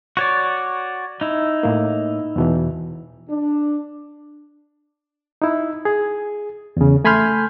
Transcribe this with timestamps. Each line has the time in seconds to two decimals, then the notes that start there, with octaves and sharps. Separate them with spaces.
0.17 F#4 C#5 D5 C#6
1.21 D#4 E4
1.63 A2 A#3
2.36 E2 B2 E3
3.30 D4
5.42 D#4 E4
5.85 G#4
6.77 E2 C#3
7.04 A3 G#5 B5 C6 F6 G6